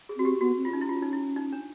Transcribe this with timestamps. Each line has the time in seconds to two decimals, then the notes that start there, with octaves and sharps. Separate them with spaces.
0.09 G#4
0.17 C4 F#4
0.25 G4
0.41 B3 F#4
0.57 C4
0.65 F4
0.73 C#4 D#4
0.81 E4
0.89 F4
1.02 D#4
1.13 E4
1.36 D#4
1.53 D4